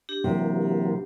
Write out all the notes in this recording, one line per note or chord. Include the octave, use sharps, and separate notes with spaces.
D4 G4
C3 E3 F#3 A#3